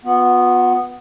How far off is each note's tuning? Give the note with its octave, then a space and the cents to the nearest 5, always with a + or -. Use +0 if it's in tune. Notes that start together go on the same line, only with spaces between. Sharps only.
B3 +0 F4 +40